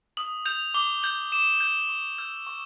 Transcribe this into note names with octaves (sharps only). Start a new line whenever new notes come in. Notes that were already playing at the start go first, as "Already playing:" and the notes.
D#6 F#7
G6 F7
D6 G7
G6 F#7
D6 E7
G6
C#6
E6 G6
C#6